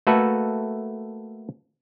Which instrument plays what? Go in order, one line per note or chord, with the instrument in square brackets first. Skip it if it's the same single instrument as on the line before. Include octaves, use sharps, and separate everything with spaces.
[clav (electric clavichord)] A3 A#3 F#4 A4 B4 E5